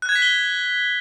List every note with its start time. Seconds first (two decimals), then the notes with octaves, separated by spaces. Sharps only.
0.02 F#6
0.09 G#6
0.15 B6
0.22 G7